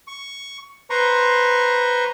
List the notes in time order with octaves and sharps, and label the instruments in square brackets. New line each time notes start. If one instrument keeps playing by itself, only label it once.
[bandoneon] C#6
B4 C5 A#5 C6 C#6